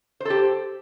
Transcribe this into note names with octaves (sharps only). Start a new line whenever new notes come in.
G4 A4 C5